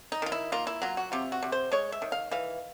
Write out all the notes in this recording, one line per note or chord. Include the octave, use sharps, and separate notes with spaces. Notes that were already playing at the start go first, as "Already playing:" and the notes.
D#4
D#3 F4
E4
A#3 F4
E4
F#3 F4
F#4
C3 F4
F#4
C3
C5
G#3 C#5
E5
D#3
F5
E3 F5